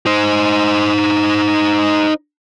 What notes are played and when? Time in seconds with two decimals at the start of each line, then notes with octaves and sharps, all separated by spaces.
0.06 D#4 C5